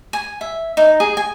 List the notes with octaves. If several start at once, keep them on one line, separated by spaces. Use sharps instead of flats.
G#5
E5
D#4
G#4
G#5